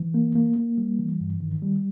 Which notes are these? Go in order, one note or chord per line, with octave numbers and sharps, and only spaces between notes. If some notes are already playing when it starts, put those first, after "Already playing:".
Already playing: E3
A#3
A#3
A#3
G3
E3
G2
D#3
G3